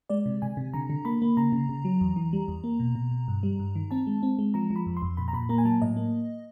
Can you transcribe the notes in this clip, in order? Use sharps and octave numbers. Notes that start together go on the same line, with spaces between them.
G#3 D5
C3
C3 G#5
C3
D3 A#5
D3
A#3 B5
A#3
C#3 A#5
C#3
C#3
F#3
E2
E3
G3
E2
A#3
B2
B2
B2
G2
G3
G2
D#3
C4 A5
G#3
C4
G#3
F3 A#5
F3
B5
F2
C6
F2
A#2 B5
A#5
A#2 B5
A#3 A#5
G#5
F#3 A5
A2 D#5
A#3